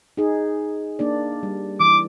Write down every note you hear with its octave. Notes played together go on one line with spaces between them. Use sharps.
D#4 G#4
A#3 D4 D5
G3
E3 D6